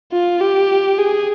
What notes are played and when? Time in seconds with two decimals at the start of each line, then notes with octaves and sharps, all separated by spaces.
0.12 F4
0.41 G4
0.98 G#4